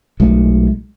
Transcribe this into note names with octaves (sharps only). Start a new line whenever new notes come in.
B1 G#3 A3